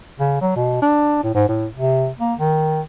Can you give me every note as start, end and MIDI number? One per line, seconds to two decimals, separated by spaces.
0.20 0.39 49
0.41 0.53 54
0.56 0.80 47
0.82 1.22 62
1.23 1.33 45
1.35 1.47 44
1.49 1.66 45
1.76 2.09 48
2.19 2.34 58
2.39 2.81 51